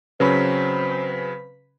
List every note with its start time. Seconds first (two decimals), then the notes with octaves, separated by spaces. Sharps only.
0.20 C#3 F#3 C4 C#4 B4 B5 B6